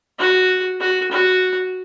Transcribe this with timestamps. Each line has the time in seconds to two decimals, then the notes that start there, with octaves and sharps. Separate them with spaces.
0.19 F#4
0.80 F#4
1.11 F#4